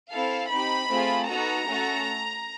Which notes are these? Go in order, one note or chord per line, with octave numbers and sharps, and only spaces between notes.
C4 E4 A4 F5
C4 D#4 G4 B5
A3 C4 F4 G#4
B3 D#4 F#4 A4 A#5
A3 C#4 F#4 A4